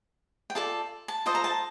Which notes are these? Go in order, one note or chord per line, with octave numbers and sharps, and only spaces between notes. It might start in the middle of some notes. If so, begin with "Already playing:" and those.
G5
F4 A4 D5 A5
A5
F4 A4 C5 D#5 A5
A#5
A5